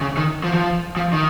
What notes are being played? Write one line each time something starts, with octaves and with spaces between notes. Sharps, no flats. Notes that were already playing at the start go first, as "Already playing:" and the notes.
C#3
D#3
F3
F3
F3
D#3